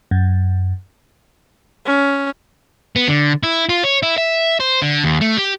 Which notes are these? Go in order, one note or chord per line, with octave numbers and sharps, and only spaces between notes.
F#2
C#4
B3
D3
E4
F4
C#5
E4
E5
C5
D3
D#2
A3
G4